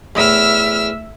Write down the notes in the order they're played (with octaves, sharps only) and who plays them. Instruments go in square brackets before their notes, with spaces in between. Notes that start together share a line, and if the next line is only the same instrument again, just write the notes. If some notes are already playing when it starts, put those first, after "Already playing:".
[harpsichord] E2 A2 [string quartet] E5 E6 F6